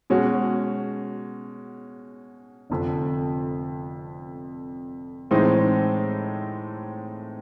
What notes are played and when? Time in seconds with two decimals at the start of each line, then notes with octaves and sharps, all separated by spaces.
0.10 B2 G#3 C#4 F#4
2.70 F1 F2 D3
5.31 A2 E3 G#3 C4 D#4